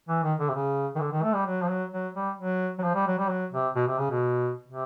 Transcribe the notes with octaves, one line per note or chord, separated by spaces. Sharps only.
E3
D#3
D3
C3
C#3
D#3
D3
D#3
A3
G3
F#3
F3
F#3
F#3
G3
F#3
F#3
F3
G3
F#3
G3
F#3
C3
B2
C3
C#3
B2
C3